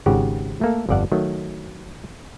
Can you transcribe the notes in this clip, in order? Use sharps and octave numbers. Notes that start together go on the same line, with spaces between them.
G#1 G#2 C#3 F#4 G4 F#5
A3 A#3 A4
G1 F2 A4 D5 F5 F#5
D#3 F#3 A3